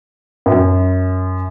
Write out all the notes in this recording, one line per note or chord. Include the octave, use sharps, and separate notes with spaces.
F#2